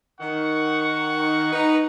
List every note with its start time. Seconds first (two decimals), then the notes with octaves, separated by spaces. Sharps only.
0.21 D#3 F#5 C#6
1.53 D#4 B4